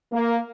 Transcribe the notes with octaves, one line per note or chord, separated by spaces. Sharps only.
A#3